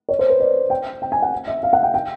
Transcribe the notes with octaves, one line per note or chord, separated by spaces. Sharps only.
C#5
C5
B4
D5
G5
G5
G#5
F#5
E5
F5
F#5
G5
G5